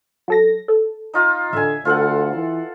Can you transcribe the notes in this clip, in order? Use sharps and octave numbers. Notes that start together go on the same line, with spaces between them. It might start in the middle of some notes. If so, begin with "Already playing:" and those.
F#3 A4 A#6
A4
D#4 F4
A1 D3 E5 G#5
D2 F4 A4 F#5
E3